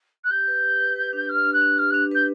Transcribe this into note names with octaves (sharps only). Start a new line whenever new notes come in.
F#6
G4 G6
B4
G4
B4
B4
D4
G4 F6
D4
F#6
D4
G4 F6
D4 F#6
B4 G6